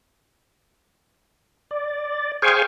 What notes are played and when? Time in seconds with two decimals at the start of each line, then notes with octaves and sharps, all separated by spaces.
1.71 D5
2.42 G#4 C5 F5 G5 G#5 C#6